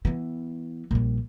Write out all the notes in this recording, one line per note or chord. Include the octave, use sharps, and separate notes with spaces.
E3 B3
A#1 G3